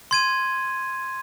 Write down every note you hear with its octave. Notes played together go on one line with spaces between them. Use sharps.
C6 G#6 D#7